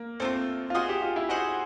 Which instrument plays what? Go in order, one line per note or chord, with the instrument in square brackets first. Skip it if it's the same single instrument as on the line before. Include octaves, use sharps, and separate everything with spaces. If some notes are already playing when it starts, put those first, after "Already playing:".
Already playing: [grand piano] A#3
[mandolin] A3 D4 [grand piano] C4
[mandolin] F4
[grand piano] F4
[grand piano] F#4 [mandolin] G#4 C5 D#5 F#5
[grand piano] G4
F4
E4
[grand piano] F#4 [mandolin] G#4 C5 D#5 F#5